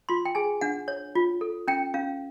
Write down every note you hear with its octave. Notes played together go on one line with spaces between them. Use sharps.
F4 C6
G5
G#4 G#5
D4 F#5
C#5
F4
A4
C#4 G5
C#4 F5